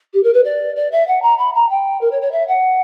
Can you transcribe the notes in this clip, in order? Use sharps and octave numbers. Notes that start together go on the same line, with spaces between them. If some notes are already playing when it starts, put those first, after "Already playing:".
G4
A#4
B4
D5
D5
E5
F#5
A#5
B5
A#5
G5
A#4
C#5
C#5
E5
F#5